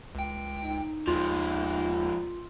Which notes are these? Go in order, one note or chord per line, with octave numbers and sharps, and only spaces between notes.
C#2 G5
D#4
D#2 F3 G#3 F4